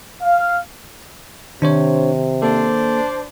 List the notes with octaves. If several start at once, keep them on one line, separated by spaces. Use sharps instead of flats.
F5
C3 D#3 D4 C5 C#5
A#3 D4 A4 C5